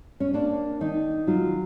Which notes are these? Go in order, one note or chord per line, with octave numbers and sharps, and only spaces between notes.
C#4
A#3 D4
D#3 D#4
F#3 F4